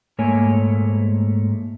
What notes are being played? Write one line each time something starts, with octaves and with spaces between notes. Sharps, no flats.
G#2 A3 A#3 C#5 G#5